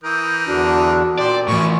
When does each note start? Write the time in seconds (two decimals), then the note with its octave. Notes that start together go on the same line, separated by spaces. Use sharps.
0.04 E3 A#4 D#6 G6
0.47 E2 D3 D4 F#4
1.19 A#2 G4 C5 D5
1.48 A2 E3 F3 C#4 C#6